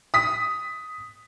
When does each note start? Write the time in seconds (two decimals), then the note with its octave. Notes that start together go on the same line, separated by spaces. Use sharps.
0.14 D#6 B6